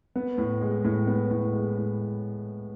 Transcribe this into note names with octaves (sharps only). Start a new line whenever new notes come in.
B3
A2
G#3
A2
B3
A2
G#3
A2